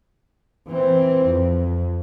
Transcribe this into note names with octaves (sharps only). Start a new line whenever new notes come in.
E3 C4
F2